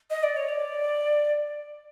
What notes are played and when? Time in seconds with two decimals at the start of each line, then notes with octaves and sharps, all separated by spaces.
0.10 D#5
0.23 D5
0.37 C#5
0.49 D5